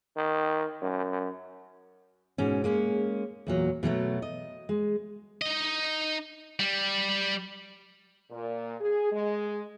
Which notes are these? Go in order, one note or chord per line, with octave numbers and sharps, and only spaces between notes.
D#3
F#2
G#2 B2 C#4
G#3 A#3 C#4
E2 A#2 F#3
B2 F#3 G#3 A3
D#5
G#3
D#4 D#5
G3
A#2
G#4
G#3